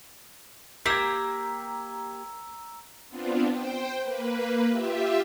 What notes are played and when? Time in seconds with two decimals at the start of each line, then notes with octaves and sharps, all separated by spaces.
0.86 A#3 G4 A#5 E6 G#6 B6
3.09 B3 C4 D4 F4
3.51 C5 G5
4.01 A#3 B4
4.69 F4 G4 E5